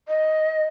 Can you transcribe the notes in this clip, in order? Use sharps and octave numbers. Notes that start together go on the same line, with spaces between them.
D#5